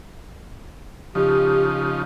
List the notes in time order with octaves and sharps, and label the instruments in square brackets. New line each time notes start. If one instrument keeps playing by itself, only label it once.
[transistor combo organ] C#3 F3 D#4 [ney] G4